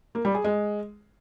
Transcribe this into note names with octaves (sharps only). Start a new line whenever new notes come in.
A#3
G3
G#4
G#3